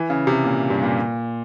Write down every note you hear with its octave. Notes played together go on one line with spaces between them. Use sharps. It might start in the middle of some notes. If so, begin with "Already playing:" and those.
Already playing: E3
C#3
C3
A#2
G2
A#2